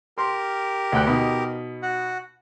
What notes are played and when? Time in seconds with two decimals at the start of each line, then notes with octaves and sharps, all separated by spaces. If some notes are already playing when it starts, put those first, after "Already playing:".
0.18 G4 A#4 C6
0.92 D2 G5 F#6
1.07 B2 D#4
1.83 F#4 F#5